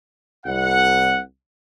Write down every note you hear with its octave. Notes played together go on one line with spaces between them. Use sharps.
C2 F#5